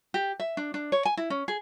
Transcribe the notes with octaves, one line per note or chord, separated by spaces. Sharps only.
G4
E5
D4
D4
C#5
G#5
E4
C#4
G#4